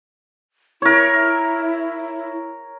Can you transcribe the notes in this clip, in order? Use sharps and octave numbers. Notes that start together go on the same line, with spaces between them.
E4 A#4 C#5